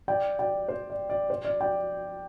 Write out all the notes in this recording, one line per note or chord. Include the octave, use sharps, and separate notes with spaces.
D5 G5
D5 G5
C5
D5
D5
C5
D5
D5 G5